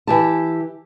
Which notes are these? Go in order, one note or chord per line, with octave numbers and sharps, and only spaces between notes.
E3 G4 A5